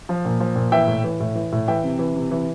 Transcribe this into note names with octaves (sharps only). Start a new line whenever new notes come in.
F3
A#2
F3
A#2
E3 E5 G5
A2
E3
A2
E3
A2
E3 E5 G5
C3
E3
C3
E3